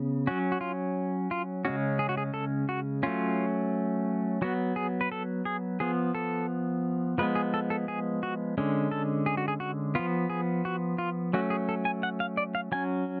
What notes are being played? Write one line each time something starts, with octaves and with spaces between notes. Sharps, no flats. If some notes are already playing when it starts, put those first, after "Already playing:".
Already playing: C#3 B3
F#3 C#4 F#4
F#4
F4
F4
C#3 G#3 C#4 F#4
G#4
F#4
G#4
A4
F#4
F#3 A3 C#4 F4
F#3 B3 F#4
G#4
B4
A4
G#4
F3 B3 G#4
A4
F3 G#3 B3 B4
G#4
A4
A4
G#4
F#4
D3 G#3 C#4
A4
G#4
F#4
G#4
F#4
F3 B3 F4
G#4
F#4
F4
F#3 A3 C#4 F#4
G#4
A4
G#5
F#5
F5
D5
F5
F#3 C#4 G#5